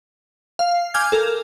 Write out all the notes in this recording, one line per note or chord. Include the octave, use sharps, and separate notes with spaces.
F5
G#5 D6 F6 G6 G#6
A4 A#4